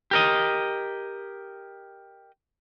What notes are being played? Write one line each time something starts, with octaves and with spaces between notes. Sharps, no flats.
G4 A#4 D#5